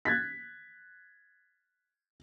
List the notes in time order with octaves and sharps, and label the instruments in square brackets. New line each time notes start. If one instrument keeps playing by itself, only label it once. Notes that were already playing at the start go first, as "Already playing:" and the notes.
[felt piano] F#6 G#6 A6 B6